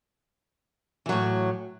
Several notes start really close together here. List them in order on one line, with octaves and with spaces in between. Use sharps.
E3 F#3 A2